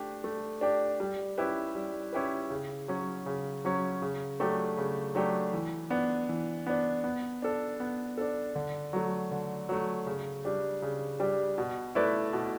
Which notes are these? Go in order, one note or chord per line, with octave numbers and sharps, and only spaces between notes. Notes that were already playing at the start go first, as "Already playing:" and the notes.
Already playing: A3 D4 G4 D5
A3
D4 G4 D5
G3
C#4 E4 G4 B4
G3
C#4 E4 G4 B4
C#3
F#3 C#4
C#3
F#3 C#4
C#3
F#3 A3 D4 G4
C#3
F#3 A3 D4 G4
E3
B3 D4
E3
B3 D4
B3
D4 A4
B3
D4 A4
D3
F#3 A3
D3
F#3 A3
C#3
G3 D4 G4
C#3
G3 D4 G4
B2
A3 E4 B4 D5
B2